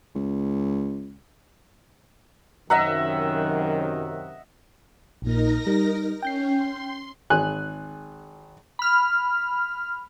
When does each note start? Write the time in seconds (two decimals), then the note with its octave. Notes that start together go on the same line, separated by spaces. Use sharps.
0.15 C#2
2.70 F#2 C3 D#3 D#5 E5 F#5 A#5
5.22 A#1 A#2 D#4 A#4 A#6
5.66 G3
6.22 C#4 G5 G6 C7
6.54 C6
7.30 G#1 G#5 F#6
8.79 B5 F6